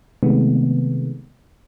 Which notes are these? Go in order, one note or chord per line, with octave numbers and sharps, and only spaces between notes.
C3 D#3 G#3 A3 B3